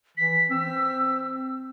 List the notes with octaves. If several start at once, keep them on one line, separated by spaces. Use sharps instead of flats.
E3 B6
C4 E6